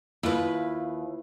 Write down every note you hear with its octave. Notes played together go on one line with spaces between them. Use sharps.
D#2 E4 F4 B4